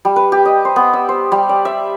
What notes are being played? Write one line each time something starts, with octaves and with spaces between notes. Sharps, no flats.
G3
B4
G4
D#5
C5
B3
E6
C5
G3
D5
E5